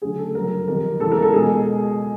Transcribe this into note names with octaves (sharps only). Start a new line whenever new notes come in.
D2 C#3 F#3 G#4
A4
G1 F#2 C#3 F#3 A#4
F2 C3 D#3 A#4
E2 C#3 E3 G#3 A4
A#4
A4
C#2 B2 G#3 G#4